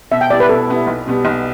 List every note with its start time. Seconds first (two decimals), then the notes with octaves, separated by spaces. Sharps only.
0.11 B2 E5
0.21 G5
0.30 G3 B3 E4 D5
0.40 B4
0.49 B2 A4
0.68 G3 B3 E4
0.87 B1
1.06 B2 G3 B3
1.25 B1